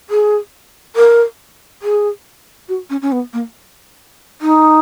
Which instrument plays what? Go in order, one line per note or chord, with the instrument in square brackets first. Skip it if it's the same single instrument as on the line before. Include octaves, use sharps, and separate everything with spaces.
[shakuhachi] G#4
A#4
G#4
F#4
C#4
C#4
B3
A#3
D#4